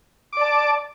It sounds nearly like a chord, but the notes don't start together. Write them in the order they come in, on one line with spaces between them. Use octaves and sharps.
D6 D5 A5